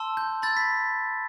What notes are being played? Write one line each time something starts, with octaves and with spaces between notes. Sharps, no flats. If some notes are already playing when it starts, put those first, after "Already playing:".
Already playing: A5 C6 E6
G6
B5 E6 G6 A6
B6